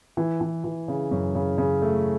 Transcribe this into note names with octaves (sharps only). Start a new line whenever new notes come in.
E3
E3
E3
C#3
F#2
C#3
C#3
A3